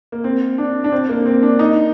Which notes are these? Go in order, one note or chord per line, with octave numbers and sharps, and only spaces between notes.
A#3
C4
D4
D4
C4
A#3
C4
D4
D#4